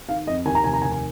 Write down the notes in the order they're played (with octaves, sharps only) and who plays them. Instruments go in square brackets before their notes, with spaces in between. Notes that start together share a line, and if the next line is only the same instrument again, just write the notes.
[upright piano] D#3 F5
F2 D#5
D#2 G#5
A#5
F1 G#5
A#5
D#2 G#5
G#5